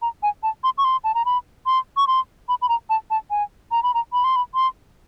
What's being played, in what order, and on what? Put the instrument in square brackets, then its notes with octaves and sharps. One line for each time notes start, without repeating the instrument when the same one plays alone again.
[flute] A#5
G#5
A5
C6
C#6
C6
A5
A#5
B5
C6
C#6
C6
B5
B5
A#5
A5
A5
G#5
A#5
B5
A#5
B5
C6
B5
C6